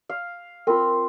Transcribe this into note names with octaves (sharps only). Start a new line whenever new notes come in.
F5
C4 F4 A#4